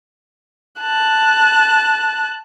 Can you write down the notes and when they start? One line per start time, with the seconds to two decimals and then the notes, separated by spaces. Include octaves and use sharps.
0.80 A5 F#6